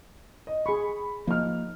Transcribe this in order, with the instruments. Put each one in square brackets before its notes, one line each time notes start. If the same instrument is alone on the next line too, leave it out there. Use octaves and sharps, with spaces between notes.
[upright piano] D#5
[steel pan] G#4 C#6 [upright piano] B5
[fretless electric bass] F3 A#3 [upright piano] D#4 F6